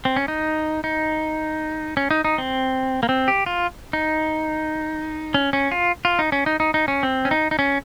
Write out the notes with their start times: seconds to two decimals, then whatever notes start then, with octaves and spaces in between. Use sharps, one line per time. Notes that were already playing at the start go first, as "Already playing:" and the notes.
0.05 C4
0.16 C#4
0.28 D#4
0.84 D#4
1.97 C#4
2.11 D#4
2.25 D#4
2.38 C4
3.03 A#3
3.09 C4
3.28 G4
3.46 F4
3.93 D#4
5.34 C#4
5.53 C#4
5.71 F4
6.05 F4
6.19 D#4
6.32 C#4
6.46 D#4
6.60 D#4
6.74 D#4
6.88 C#4
7.03 C4
7.25 C#4
7.31 D#4
7.51 D#4
7.59 C#4